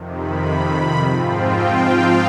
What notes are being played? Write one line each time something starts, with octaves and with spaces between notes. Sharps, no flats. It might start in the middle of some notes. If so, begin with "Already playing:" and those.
Already playing: F2 C3 D#3
B5
B5
G#2 F3 C4 F4
G5
F5